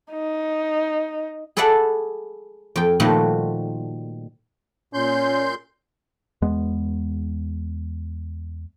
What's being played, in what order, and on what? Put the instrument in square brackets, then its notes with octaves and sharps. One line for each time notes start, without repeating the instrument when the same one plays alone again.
[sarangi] D#4
[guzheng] G#4 A4 B4 D5 E5 F#5
F2 G5
A#2 D#3 F3 G3 A3 F#4
[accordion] A#2 C6 G6 [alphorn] C#4
[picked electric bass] E2 G#3 B3